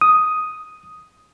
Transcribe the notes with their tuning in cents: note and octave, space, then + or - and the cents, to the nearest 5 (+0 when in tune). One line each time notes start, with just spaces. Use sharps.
D#6 +5